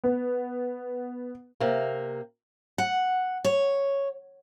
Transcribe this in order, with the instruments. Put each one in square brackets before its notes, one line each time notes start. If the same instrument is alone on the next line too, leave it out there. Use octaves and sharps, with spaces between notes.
[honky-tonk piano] B3
[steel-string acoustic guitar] C3 A#3
F#5
C#5